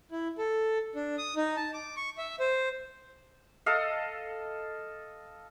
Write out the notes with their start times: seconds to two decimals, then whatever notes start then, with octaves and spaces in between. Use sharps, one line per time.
0.11 E4
0.38 A4
0.95 D4
1.18 D#6
1.36 D#4
1.57 A5
1.74 D6
1.97 C#6
2.18 E5
2.40 C5
3.66 A4 D#5 F5